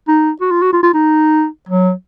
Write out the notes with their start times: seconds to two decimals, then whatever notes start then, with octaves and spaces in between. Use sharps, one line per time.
0.08 D#4
0.41 F#4
0.51 F4
0.62 F#4
0.73 F4
0.83 F4
0.94 D#4
1.69 F#3